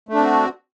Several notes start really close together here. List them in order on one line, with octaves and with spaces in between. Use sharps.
A3 D4 C4 F#4